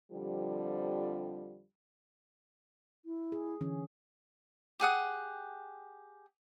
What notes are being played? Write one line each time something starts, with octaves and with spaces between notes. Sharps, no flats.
F2 D3 F3 G3
E4
G#4
D3 E3 C#4
G4 G#4 F#5 D#6